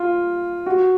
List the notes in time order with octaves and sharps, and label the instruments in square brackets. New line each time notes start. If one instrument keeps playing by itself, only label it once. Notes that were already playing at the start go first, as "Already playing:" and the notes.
Already playing: [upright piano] F4
F#4